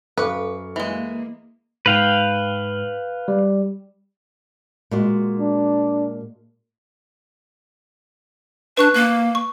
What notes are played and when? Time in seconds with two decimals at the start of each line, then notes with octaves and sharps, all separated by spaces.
0.18 F#2 A4 B4 C5 F5 C#6 D6
0.76 E3 G#3 A#3
1.86 G#2 B4 F5 G5
3.28 G3
4.91 A#2 G#3 F#4
5.39 D4
8.77 D4 B4 C#6 F#6
8.94 A#3 F#6
9.35 C#6